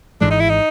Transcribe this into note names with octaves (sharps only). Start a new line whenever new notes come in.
G#1 G#2 E3 G#3 D4
D#4
E4
D#4